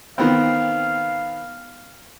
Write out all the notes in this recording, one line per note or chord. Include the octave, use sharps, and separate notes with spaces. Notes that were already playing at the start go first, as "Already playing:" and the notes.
D#3 B3 C4 F5